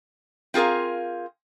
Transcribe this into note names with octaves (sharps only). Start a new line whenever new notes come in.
C4 F4 G#4 A#4 F5